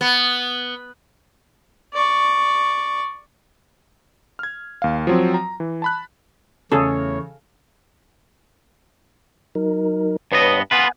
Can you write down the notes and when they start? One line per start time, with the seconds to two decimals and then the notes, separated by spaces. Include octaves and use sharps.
0.01 B3
1.93 D5 C#6
4.39 F6 G#6
4.82 D#2 F5
5.07 F3 F#3 C4
5.34 A#5
5.60 E3
5.82 A5 B5 F#6
6.72 E2 C#3 A3 G#4 A4 C#5
9.55 F#3 D#4 A#4
10.32 G2 B3 B4 C#5 D#5
10.71 B3 F4 B4 F#5 G#5